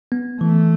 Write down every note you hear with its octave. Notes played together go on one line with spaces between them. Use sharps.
B3
E3 A3